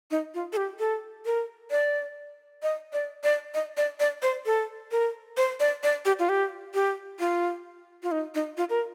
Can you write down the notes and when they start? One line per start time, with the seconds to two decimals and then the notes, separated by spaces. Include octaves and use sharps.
0.11 D#4
0.34 F4
0.53 A4
0.57 G4
0.79 A4
1.25 A#4
1.71 D5
2.63 D#5
2.93 D5
3.24 D5
3.54 D#5
3.77 D5
4.00 D5
4.22 C5
4.46 A4
4.91 A#4
5.37 C5
5.60 D5
5.83 D5
6.05 G4
6.19 F4
6.29 G4
6.74 G4
7.20 F4
8.03 F4
8.12 D#4
8.35 D#4
8.57 F4
8.70 A#4